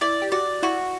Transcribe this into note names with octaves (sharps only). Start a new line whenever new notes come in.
E4 D5
G4
F#4 D5
E4 F#4